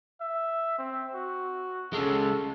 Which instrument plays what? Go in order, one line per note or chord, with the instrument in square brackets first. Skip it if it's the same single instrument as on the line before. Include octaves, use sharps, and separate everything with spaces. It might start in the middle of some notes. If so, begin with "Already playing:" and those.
[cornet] E5
C4
F#4
[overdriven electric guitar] C#3 G#3 [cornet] A4